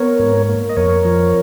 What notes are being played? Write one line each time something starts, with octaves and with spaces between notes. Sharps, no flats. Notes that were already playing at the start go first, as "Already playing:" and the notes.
Already playing: B3 A#4 C#5
G#2
A#3
D#5
F2 A#4 C#5
F3